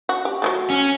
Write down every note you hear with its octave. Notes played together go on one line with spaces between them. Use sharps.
F#4
G4
F#3 G#3 A3
C#4